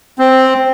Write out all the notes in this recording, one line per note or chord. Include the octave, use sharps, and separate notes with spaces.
C4